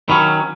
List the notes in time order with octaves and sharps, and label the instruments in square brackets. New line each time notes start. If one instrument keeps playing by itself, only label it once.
[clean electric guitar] D#3 F#3 C#4 [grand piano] B5